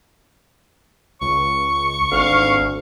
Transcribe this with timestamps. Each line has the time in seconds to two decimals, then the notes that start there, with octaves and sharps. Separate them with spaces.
1.21 C#2 C#6
2.11 G#1 D2 F5